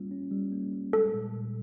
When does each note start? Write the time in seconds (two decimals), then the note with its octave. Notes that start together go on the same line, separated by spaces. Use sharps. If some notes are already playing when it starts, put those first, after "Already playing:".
Already playing: G3 A#3 C#4 F4
0.11 C#4
0.31 G3
0.52 A#3
0.73 G3
0.93 G#3 A4
1.14 A#2
1.35 A#2